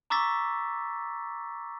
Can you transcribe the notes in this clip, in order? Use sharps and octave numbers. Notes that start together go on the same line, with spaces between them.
A#5 C#6 D6 E6 A6 B6